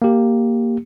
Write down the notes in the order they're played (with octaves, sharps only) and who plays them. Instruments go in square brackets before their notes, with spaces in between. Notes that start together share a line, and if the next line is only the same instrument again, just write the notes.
[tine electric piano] A#3 G4